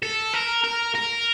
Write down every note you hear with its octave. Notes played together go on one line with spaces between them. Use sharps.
A4
A#4
A#4
A#4